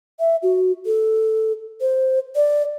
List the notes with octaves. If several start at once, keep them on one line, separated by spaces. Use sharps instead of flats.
E5
F#4
A4
C5
D5